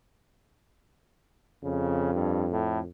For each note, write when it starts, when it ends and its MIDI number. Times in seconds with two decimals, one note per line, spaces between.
1.64 2.87 41
1.64 2.14 49
2.14 2.45 43
2.52 2.79 45